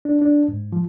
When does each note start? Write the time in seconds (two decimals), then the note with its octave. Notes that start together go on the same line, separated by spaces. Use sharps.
0.05 D4
0.22 D4
0.48 G#2
0.72 F3